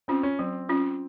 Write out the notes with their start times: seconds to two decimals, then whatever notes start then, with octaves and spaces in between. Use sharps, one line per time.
0.08 C4 C#4 F4
0.23 C#4
0.39 F#3 C4
0.69 C#4 F4